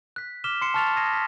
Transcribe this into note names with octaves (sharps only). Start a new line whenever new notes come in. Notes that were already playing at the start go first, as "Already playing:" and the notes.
F#6 B6
D6 F6 B6 E7 G7
C6 C7 C#7 E7
A5 C#6 F6 A6 C#7 F7
D#6 G#6 A#6 C7 D#7
F6 B6